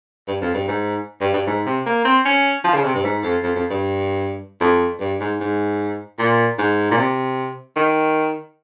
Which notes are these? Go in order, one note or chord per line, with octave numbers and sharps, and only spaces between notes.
G2
F2
G2
G#2
G2
G2
G#2
C3
A#3
C4
C#4
F3
C#3
C3
G2
G#2
F2
F2
F2
G2
F2
G2
G#2
G#2
A#2
G#2
A#2
C3
D#3